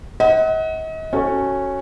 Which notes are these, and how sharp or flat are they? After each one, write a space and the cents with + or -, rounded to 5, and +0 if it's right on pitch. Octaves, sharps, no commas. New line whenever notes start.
D#5 +40 F#5 +10
C#4 -10 F#4 +10 A4 +15